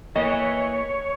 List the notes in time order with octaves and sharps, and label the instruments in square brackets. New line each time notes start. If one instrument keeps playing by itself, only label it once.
[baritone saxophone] E3 [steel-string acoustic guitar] A#3 [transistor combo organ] C#5 [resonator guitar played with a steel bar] D#5